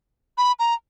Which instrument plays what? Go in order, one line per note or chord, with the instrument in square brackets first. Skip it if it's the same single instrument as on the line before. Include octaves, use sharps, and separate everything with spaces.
[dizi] B5
A#5